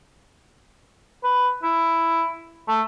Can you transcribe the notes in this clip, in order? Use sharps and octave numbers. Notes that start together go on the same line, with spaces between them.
B4
E4
A3